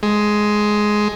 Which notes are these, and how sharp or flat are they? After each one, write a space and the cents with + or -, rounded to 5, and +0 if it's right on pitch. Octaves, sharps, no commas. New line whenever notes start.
G#3 +10